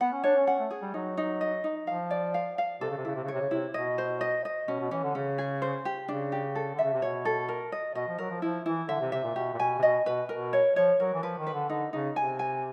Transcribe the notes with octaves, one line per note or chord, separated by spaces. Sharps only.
B3 F#5
C#4
D4 C#5
C#4
C#4 F#5
A3
G#4
G3
F#3 D#4
D#4
D#5
D#4
F3 F5
D5
F5
F5
C3 A4
C#3
C3
C#3 E4
C3
C#3
C3 C#5
C#3
C3 E4
B2 D#5
C5
D#5
D#5
B2 C#4
B2
E3 C#4
D3
C#3 C#4
G#4
C5
G4
C#3 D4
G4
A4
D3
C#3 E5
C3
B2 C#5
A4
A#4
D#5
B2 D#5
F3
F#3 A#4
F3
F3 E4
E3 E4
D3 E5
C3
C3 E5
A#2
B2 G4
A#2
B2 G#5
C3
B2 D#5
B2 B4
B2 A#4
C#5
F3 C#5
F#3 A#4
E3
F3 B4
D#3
B4
D3
D3 D#4
C#3 D#4
C3 G#5
G#5